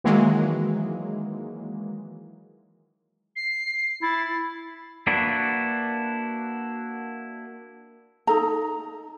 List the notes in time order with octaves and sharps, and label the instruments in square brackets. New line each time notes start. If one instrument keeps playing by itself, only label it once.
[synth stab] D#3 E3 F#3 G#3 A#3
[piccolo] C7
[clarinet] E4 [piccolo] A6
[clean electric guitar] A#3 D4 E4 F#4 B4
[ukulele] D#4 A4 A#5